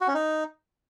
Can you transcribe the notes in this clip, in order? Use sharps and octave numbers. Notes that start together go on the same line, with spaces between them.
F#4
C#4
D#4